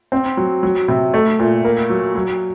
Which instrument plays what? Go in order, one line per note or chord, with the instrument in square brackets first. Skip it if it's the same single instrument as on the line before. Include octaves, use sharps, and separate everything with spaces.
[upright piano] C4
F#3
F#3
C3
A3
A#2
A#3
F#3
F#3